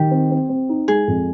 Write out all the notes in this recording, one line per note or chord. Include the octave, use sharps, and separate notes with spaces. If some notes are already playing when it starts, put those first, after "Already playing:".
Already playing: D#3 G4
C4
C4
C4
D#4
G#3 G#4
F2